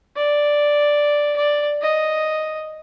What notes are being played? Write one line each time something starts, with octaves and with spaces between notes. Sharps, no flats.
D5
D5
D#5